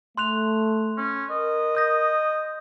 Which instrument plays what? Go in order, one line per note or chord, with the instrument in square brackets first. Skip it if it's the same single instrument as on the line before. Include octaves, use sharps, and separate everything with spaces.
[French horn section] A3 [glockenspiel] C6 F#6 F7
[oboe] C#4
[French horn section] A#4 [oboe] D#5
[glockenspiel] D#6 G6 A#6